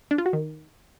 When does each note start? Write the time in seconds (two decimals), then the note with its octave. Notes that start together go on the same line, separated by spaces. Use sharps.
0.11 D4
0.18 F4
0.26 F#4
0.33 D#3